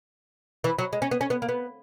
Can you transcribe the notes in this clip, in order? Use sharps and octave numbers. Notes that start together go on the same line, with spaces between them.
E3
F#3
G#3
C#4
B3
C#4
B3
A#3
B3